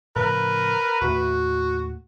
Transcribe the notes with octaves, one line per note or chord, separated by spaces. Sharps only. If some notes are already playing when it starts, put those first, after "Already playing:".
A2 C#3 F3 A#4 B4
D#2 A2 A3 F#4